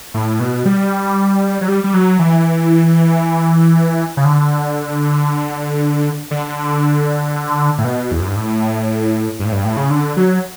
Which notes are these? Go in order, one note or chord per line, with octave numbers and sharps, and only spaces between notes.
A2
B2
G3
F#3
G3
G3
F#3
E3
C#3
D3
D3
A2
B2
E2
F#2
G2
A2
G2
A2
G2
A2
C#3
D3
F#3